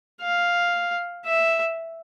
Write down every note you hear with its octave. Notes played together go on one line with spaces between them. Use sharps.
F5
E5